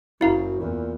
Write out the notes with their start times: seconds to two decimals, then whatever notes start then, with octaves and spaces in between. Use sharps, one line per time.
0.21 F#1 F#2 E4 F5 A#5
0.60 E2 A#2